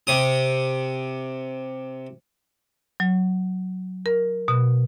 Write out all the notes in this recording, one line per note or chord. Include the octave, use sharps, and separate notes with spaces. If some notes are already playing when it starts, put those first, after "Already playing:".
C3 D#6
F#3
A#4
B2